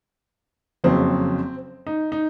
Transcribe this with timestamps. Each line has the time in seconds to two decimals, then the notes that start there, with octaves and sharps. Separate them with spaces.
0.84 F#1 F2 C#3 F#3 C4
1.87 D#4
2.12 D#4